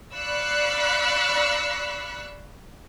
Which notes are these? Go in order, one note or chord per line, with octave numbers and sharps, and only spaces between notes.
D5 F5 B5 C#6 E6 F#6